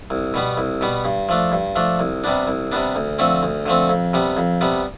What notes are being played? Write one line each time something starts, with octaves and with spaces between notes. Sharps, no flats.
C2
B2 G3 B3
C2
B2 G3 B3
G2
F3 A3 D4
G2
F3 A3 D4
C2
C3 G3 B3 D4
C2
C3 G3 B3 D4
D2
D3 F3 A3 C4
D2
D3 F3 A3 C4
F2
C3 G3 B3
F2
C3 G3 B3